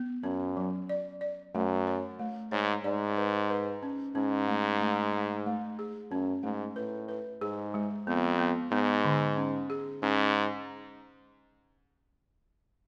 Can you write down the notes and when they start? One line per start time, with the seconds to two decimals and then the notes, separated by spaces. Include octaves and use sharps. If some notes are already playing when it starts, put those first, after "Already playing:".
Already playing: B3
0.23 F#2 C#4
0.57 F#3
0.89 D5
1.21 D5
1.54 F#2 A3
1.87 C#5
2.19 A3
2.52 G#2 C#5
2.84 G#2 D5
3.17 B4
3.50 B4
3.83 C#4
4.15 G#2 C#4
4.48 A3
4.81 A3
5.13 A3
5.46 A3
5.79 G#4
6.11 F#2 C#4
6.43 G#2 A3
6.76 A2 B4
7.09 B4
7.41 G#2 G#4
7.74 G#3
8.07 F2 B3
8.39 B3
8.72 G#2 B3
9.05 D3
9.37 C#4
9.70 G#4
10.03 G#2 C#4